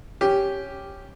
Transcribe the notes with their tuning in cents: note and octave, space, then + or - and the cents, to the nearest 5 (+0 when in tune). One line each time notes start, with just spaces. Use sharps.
C#4 +0 G4 +0